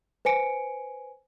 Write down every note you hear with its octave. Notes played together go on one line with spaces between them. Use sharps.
B4 C5 G#5 C#7 D7